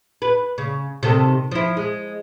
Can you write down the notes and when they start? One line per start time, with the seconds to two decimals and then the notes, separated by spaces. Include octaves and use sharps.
0.22 B4
0.58 C#3
1.03 C3 D#3 A4
1.51 F3 E4
1.77 G#3